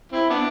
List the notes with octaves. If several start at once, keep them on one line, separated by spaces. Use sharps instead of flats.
C4 E4
B3 D4